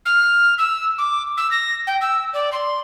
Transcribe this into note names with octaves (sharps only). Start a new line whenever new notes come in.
F6
E6
D6
E6
A#6
G5
E6
D5
C6